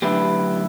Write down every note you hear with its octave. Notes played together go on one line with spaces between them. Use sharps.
F#2 D3 A3 E4 G4 B4